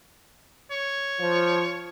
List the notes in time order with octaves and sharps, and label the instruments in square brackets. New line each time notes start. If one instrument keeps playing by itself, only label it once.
[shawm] C#5
[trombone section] F3